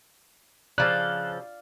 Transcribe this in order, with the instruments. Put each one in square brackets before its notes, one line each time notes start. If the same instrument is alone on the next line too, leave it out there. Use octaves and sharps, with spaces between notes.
[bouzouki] C#3 F3 A4 [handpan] D5 F5 [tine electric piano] F#6